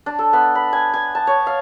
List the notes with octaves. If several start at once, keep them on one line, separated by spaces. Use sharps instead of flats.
D4
A4
B3
B5
G#5
G#5
A5
C#5
F5